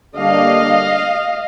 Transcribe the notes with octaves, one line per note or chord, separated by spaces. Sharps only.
D3 G3 A#3 D4 D#5 F5